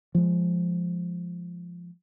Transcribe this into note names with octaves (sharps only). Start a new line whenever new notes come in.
F3 G#3